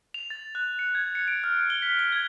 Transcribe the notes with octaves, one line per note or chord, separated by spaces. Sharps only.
F7
A6
F#6
C#7
G#6
C#7
D7
F6
G7
B6
G7
G#6